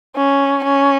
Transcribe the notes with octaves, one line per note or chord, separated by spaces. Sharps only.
C#4
C#4